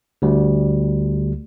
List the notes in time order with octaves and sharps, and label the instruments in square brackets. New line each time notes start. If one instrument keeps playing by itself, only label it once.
[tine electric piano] D2 G3